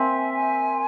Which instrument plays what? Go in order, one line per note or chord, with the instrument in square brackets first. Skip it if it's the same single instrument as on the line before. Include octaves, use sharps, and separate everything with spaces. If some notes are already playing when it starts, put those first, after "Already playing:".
Already playing: [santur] A#3 C4 [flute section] E5 G#5
[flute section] G#5